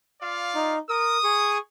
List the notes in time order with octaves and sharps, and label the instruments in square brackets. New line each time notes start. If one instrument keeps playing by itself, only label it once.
[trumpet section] F4 D5 F5
[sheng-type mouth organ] D#4
[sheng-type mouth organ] A#4 [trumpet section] D#6
[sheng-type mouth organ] G#4 C#6